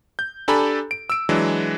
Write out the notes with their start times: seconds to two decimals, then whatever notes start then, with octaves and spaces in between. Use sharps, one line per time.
0.19 G6
0.48 D4 G4 A4 G#5 A#5 B5
0.91 D7
1.10 E6 D7
1.29 E3 F#3 G#3 D4